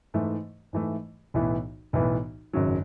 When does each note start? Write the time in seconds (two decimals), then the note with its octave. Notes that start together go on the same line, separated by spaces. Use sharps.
0.14 G#2 E3 A3
0.73 G#2 E3 A3
1.34 B1 A2 E3 B3
1.93 B1 A2 E3 B3
2.53 G#1 F#2 C#3 F#3